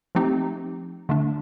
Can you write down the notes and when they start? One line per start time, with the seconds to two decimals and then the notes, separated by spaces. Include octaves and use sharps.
0.15 F3 A3 C4 D#4 G4
1.09 D3 A3 D4